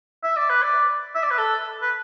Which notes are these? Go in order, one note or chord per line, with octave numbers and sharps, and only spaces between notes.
E5
D5
B4
D5
E5
D5
B4
A4
B4